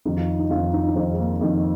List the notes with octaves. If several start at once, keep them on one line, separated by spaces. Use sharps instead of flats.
F2 D#3 D#4
F4
D#4
F2 D#3 F4
D#4
D#4
F2 D#3 C4
G#3
A#3
F2 D#3